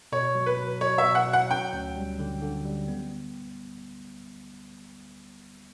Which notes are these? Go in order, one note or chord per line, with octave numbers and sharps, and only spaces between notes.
B2 C#5
F#3
B4
F#3
F#3 C#5
E5
B2
F#5
F#3
F#5
C#4 G5
D2
G3
D3
D3
G3
B3